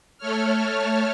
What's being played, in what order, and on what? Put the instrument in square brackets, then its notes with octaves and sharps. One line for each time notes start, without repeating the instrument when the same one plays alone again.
[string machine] A3 A4 C#5 F6